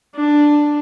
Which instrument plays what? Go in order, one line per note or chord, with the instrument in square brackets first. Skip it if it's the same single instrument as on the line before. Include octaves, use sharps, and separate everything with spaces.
[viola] D4